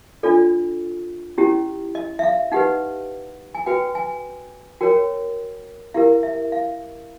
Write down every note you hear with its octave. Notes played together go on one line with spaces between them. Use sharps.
D4 F4 A4 D5
C#4 E4 G4
D#5
E5
F5
D#4 G4 B4 F#5
G#5
F#4 B4 G5
G#5
F#4 A#4 C#5 G5
E4 G4 A#4 F5
E5
F5